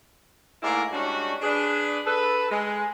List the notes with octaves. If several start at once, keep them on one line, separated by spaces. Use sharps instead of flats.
G#2 A3 A#3 E4 A#4 D5
G3 G#3 C#4 D4 F#4
D4 G#4 B4
A4 B4
G#3